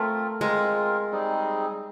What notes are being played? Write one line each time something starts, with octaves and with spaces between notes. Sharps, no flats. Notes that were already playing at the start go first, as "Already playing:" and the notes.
Already playing: A3 C4 F4 A#4
G#3 C4 F4 A#4
G3 C4 D#4 G#4